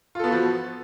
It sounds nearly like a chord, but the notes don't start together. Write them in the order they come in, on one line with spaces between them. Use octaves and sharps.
F4 A4 B3 F#4 F3